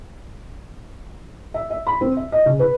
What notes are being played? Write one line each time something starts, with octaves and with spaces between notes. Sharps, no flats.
E5
E5
B5
C4
E5
D#5
C#3
B4